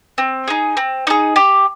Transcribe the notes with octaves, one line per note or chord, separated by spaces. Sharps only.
C4
D#4 G#4
C4
D#4 G#4
G4